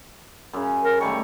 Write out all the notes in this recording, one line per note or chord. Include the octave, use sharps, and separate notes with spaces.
F#2 C#3
A#4
D#3 G3 A3 C#6